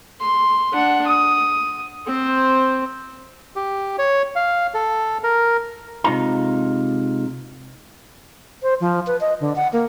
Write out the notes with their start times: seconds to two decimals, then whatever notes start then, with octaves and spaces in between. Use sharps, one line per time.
0.20 C6
0.73 D4 F#5
1.07 D#6
2.07 C4 C5
3.56 G4
3.98 C#5
4.36 F5
4.74 A4
5.23 A#4
6.04 C3 G#3 D#4 F4 A#5
8.63 C5
8.80 F3
9.07 B4
9.21 D#5
9.40 D3
9.56 F#5
9.73 A#3